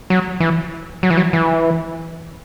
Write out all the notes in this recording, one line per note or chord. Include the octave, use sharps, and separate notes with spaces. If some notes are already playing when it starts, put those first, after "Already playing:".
F#3
E3
F#3
E3
F#3
E3